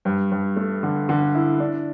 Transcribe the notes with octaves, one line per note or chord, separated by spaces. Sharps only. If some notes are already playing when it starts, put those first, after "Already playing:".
G2
G2
A3
D3
D3
E4
D4